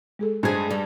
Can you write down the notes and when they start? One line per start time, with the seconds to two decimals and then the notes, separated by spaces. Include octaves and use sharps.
0.19 G#3 G#4 A4
0.43 G2 G#3 D4 G#4 C5 G#6
0.71 G3